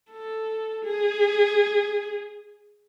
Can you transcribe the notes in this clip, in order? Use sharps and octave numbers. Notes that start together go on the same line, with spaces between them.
A4
G#4